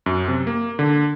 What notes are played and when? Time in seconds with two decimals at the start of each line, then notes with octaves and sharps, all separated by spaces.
0.06 F#2
0.28 C3
0.47 A#3
0.79 D3